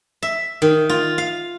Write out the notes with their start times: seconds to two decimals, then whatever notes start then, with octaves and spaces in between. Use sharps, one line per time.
0.23 E5
0.62 D#3
0.89 F4
1.18 F5